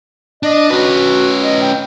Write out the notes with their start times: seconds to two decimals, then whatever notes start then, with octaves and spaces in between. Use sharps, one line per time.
0.43 D4 D#5
0.70 C#4 F#4 B4
1.41 D#5
1.62 G5